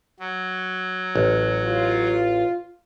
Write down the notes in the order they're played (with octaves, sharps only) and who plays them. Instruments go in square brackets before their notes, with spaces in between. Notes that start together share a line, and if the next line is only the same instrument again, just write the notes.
[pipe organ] F#3
[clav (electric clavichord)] A1
[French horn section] F4